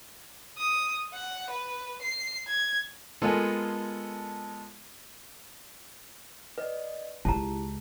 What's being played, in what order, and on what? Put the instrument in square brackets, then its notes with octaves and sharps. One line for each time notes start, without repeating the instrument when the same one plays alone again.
[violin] D#6
F#5
B4
C7
G#6
[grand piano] G#3 A#3 B3 F4 A4 G#5
[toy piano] B4 [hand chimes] D5 D#5
[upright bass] C#2 [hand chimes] E4 G4 [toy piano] A5 A#5